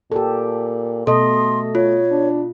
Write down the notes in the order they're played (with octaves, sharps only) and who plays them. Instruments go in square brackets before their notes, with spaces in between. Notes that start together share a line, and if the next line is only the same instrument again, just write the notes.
[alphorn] A#2 [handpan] G4 A4
[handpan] B2 D#5 [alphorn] A3 [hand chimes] A4 [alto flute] C6
[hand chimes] F4 [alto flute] C#5
[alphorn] D4